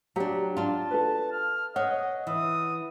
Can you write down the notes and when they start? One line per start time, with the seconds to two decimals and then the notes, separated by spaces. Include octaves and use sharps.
0.16 F#3 D4 G4 A#5
0.57 D4 F4 A5
0.91 A4 B4
1.32 F6
1.76 C#5 D#5 F#5
2.27 E3 D#6